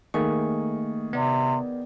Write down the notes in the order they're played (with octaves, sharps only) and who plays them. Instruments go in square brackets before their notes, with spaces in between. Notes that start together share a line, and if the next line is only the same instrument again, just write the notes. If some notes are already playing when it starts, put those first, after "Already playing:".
[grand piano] D#3 G#4 [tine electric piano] A3 A#3 C#6
[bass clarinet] C3 [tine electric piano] B3 D5